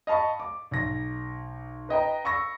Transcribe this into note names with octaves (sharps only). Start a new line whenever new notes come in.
D#5 F5 A5 B5 C#6
D6
B1 A#6
B4 D#5 G5 A#5
B5 C#6 E6 A#6